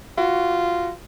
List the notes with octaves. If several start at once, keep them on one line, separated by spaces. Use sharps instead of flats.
F4 F#4